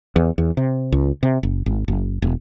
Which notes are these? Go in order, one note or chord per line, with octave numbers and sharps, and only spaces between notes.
E2
E2
C3
C#2
C3
F#1
G#1
F#1
E1